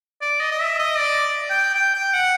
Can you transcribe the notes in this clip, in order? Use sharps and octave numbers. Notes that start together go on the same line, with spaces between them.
D5
D#5
D#5
E5
D#5
D5
G5
G5
G5
F#5